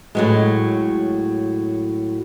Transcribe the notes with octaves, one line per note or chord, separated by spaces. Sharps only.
A2 F#3 G#3